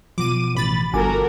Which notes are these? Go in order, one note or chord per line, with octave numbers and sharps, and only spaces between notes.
B2 F3 D6 D#7
A1 B5 A6
G1 F#4 A4 A#4 G#5 D6